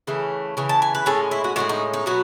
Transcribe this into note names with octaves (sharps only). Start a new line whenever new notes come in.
C#3 E3 A3
C#3 E3
A5
G#5
B4
A2 G#3 C#4 A4
E4
F#4
A2 G#3 C#4 F#4
D#4
D#4
B2 F#3 B3 F#4